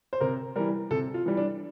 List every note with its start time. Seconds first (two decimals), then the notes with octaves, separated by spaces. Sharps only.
0.13 C5
0.21 C3 A#4
0.56 E3 G3 A#4
0.91 C3 A4
1.14 F4
1.26 E3 G3
1.37 D4